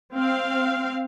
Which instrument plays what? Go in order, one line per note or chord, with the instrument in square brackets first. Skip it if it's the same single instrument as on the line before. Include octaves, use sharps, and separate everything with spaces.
[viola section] C4 F5